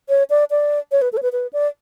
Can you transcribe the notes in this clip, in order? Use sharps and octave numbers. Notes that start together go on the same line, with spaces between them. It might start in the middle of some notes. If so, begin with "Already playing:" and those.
C#5
D5
D5
C#5
B4
A4
C#5
B4
B4
D5